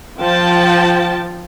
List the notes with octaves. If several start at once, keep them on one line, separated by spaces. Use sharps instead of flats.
F3 G5 A5